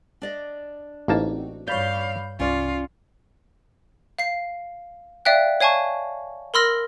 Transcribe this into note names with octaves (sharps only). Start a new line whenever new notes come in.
D4 D5 D#5
A1 A#3 C4 D#4 F#4 A5
G2 C#5 D5 F5 B5 G6
C2 C#4 F4 D5
F5 C7
D5 E5 F5 G5 F#6
C#5 F5 G#5 A5 C#6
A#4 B5 C6 E6 F6 A#6